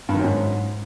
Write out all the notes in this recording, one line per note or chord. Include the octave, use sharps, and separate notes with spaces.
G2
D#3
F#2
G#2